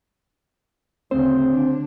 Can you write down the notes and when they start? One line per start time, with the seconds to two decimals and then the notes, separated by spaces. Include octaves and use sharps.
1.11 D2 C#3 C4 C5
1.50 D3 D4